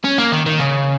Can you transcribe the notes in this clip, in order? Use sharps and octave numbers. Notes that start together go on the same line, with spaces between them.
C#4
A#3
D#3
D#3
C#3